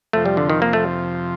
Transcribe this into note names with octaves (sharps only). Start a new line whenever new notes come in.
F2 C3 F3 A3
G3
D3
D#3
A#3
A3